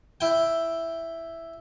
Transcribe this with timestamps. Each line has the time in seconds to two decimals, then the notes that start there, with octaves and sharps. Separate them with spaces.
0.21 E4 G5